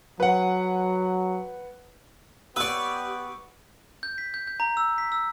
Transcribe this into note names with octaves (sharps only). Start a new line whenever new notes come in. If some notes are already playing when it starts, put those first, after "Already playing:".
F#3 B4 F#5
B3 G4 B4 D5 C#6 E6
G6
B6
G6
G6
A#5
E6
B6
E6